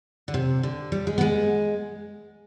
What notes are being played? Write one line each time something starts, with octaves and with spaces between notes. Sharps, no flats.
D3
C3
D3
G3
G#3
B3
G#3